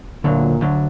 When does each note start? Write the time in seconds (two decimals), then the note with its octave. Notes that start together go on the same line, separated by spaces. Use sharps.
0.24 D2 A#2 D3 F#3
0.61 D2 D3 F#3